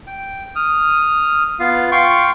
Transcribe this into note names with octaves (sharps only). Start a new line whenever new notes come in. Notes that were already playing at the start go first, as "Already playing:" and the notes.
G5
D#6 F6
B3 F4 F5
F5 G5 C6 C#6